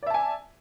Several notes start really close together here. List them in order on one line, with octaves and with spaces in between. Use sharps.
D5 E5 A5 G#5